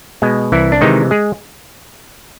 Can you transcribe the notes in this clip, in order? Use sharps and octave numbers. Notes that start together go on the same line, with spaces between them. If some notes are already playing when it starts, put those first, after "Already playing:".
B2 G#3
C2 E3 E4
D4
C3 D#3 E3 G#3 D#4
G#3 G#4